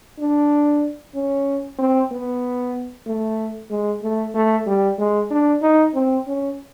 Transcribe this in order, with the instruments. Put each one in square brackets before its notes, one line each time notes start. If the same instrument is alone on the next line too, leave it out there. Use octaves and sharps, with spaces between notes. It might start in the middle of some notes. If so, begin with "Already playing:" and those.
[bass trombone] D4
C#4
C4
B3
A3
G#3
A3
A3
G3
G#3
D4
D#4
C4
C#4